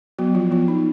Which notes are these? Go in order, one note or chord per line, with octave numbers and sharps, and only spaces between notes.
F#3 B3 F#4
F3 F4
F3 B3 F4
D#4